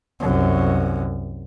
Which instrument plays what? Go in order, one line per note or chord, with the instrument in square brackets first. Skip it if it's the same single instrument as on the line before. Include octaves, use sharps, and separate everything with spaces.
[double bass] C2 F#2